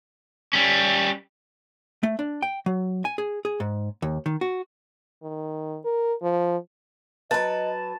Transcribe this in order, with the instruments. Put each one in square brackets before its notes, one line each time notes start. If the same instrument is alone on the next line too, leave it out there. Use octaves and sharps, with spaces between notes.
[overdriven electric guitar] G3 C#4
[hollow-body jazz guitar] A3
D4
G5
F#3
G#5
G#4
G#4
G#2
D#2
D#3
F#4
[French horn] D#3
A#4
F3
[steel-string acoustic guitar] F#3 B4 [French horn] D#5 [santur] A5